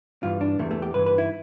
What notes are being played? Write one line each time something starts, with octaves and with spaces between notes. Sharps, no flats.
G2 E3 F4
D4
E2 C3 E3 A3
A3
G4
G2 E3 B4
B4
E4